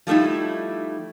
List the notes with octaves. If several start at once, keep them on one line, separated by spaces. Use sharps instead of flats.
F3 G3 A3 D#4 E4